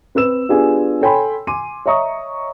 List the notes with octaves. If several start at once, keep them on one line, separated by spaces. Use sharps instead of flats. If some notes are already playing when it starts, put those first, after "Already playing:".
C4 B4 E6 E7
B3 D4 F4 G4 G#4 G#5
A4 C#5 G5 G#5 B5 C6
G#5 C6 D6 D#7
C#5 D#5 E5 A#5 C#6 D#6